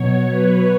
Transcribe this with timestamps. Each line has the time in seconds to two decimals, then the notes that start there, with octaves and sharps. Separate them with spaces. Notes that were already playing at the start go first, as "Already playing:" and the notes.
Already playing: B2 F#3 C#5
0.29 B4